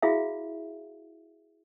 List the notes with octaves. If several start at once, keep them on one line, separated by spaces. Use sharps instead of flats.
E4 F#4 G#4 E5 F5